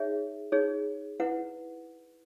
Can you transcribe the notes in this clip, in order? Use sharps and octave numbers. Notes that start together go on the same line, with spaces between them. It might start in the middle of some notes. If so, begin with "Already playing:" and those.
Already playing: D#4 G#4 C#5 E5
D#4 G#4 C#5
E4 B4 F#5